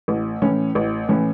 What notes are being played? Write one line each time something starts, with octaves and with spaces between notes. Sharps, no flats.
A1
A2 E3 C#4
A1
A2 E3 C#4